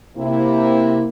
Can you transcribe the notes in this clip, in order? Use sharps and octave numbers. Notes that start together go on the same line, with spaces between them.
C3 A#3 E4